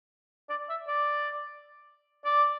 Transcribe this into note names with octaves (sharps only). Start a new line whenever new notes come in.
D5
E5
D5
D5